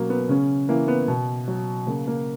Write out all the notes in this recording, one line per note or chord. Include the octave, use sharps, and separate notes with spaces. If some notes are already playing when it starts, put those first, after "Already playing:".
Already playing: B2 F#3 A#3 C#4
B3
C#3 C#4
E3 A#3
B3
B2
F#3
C#3 A#3
A#3